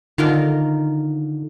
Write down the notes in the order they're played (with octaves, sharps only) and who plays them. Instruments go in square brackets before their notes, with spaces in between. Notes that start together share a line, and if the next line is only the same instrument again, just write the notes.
[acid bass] D3 [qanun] D#3 F4 A#4